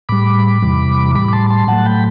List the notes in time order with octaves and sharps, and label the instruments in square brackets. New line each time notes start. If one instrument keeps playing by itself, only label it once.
[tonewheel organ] A2 G3 B5 D6
E2 C3 E3 G3
A2 G3 B5 D6
D6
A5 C6
A5 C6
A2 F#3 A3 F#5 A5
G5 B5